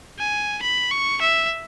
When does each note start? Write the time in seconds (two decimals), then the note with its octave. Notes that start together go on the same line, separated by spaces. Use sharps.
0.19 G#5
0.62 B5
0.91 C#6
1.21 E5